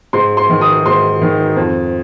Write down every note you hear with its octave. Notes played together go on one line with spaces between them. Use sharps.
G#2 C6
C6
D#3
D#6
G#2 C6
D#3
F2